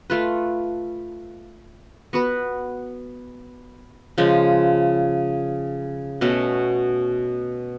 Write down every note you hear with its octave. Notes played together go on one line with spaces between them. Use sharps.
A3 F4 B4
B3 F#4 B4
C#3 F3 G#3
B2 A3 C#4